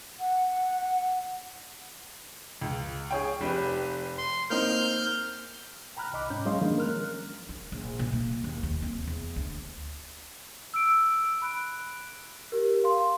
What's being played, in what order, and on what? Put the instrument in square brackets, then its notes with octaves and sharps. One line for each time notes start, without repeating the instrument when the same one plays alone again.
[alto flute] F#5
[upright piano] C#2
G#4 C#5 G5
F1 G4 B4
[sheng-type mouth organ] C6
[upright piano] A#3 C4 D#4 [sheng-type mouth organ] F6 G6
[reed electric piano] G5 A#5 B5 F6 F#6
C2 D#5 B5 D6
G#2 C#4 G6
F#3 G#3 C#4 D#5 F5 C6
D#3 F3 F#3 G#3 A#3 D4
A#4 F6 F#6
[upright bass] F4
A#1
A#2
A#3
D#2
D#2
C4
E2
D2
[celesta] E6 D7
B5 F#6 D7
G4 A#4
F5 C6